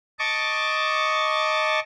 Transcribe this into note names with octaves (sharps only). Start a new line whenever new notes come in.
D#5 A5 C#6 D6